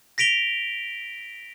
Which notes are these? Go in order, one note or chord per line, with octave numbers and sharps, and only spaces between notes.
A#6 B6 D7 F7 G7